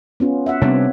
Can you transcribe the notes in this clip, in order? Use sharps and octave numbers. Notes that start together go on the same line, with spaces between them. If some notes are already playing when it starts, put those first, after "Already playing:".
B3 C#4 F4
E5 F#5
C3 G3 B3 C4 D4 C#5